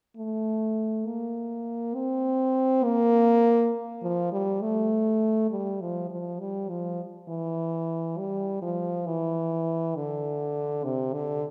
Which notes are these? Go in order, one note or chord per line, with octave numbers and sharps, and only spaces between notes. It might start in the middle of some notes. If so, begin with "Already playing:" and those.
A3
A#3
C4
A#3
F3
G3
A3
G3
F3
F3
G3
F3
E3
G3
F3
E3
D3
C3
D3